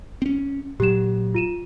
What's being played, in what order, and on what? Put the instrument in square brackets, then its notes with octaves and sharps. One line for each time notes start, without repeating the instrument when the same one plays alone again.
[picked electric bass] C4 C#4
[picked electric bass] A#2 F#3 [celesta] G4 E7
[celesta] F4 D#7 E7